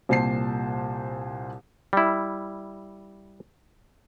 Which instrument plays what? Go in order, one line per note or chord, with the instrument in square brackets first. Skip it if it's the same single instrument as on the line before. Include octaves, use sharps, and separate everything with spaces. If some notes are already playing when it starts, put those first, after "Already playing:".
[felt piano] C2 A#2 C5 A5 C7
[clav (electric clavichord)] G3 E4